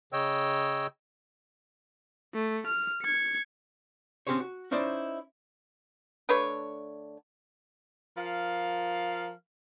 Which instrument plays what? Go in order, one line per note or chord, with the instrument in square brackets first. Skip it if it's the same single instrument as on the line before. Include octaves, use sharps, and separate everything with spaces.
[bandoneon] C#3 C#5 D#5 G5 E6
[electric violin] A3
F6
G#6 C#7
[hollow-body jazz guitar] C4 C#4 G4 G#4 C5 C#5
F#4
C#4 D#4 E4 C5 D5
[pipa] D3 A3 B4 C#5
[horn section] F3 A#4 F5